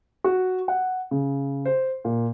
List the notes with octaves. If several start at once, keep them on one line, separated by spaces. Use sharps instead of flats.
F#4
F#5
C#3
C5
A#2